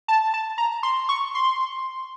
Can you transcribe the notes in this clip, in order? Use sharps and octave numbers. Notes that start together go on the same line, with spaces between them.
A5
A5
A#5
C6
C#6
C6